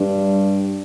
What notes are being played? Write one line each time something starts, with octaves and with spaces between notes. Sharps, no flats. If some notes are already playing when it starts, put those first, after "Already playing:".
Already playing: G2